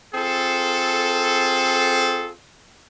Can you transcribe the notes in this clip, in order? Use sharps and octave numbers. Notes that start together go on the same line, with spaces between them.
C4 F4 G#4 A4